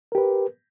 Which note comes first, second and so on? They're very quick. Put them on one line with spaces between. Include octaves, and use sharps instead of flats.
A#4 G4 B4